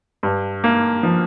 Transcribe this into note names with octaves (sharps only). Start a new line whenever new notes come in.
G2
A#3
F3